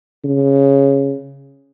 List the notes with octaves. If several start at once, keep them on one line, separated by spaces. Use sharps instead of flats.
C#3